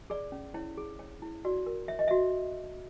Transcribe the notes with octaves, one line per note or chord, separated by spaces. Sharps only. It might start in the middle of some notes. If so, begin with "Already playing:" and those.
G#4 D5
C#4
E4 C#5
G#4
C#5
E4
F#4 D5
A#4
C#5 E5
D#5
E5
F#4